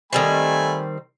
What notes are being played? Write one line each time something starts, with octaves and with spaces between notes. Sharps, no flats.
D#3 G3 A3 C4 G#5 B5